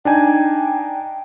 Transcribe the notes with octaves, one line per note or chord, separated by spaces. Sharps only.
D4 D#4 G5 G#5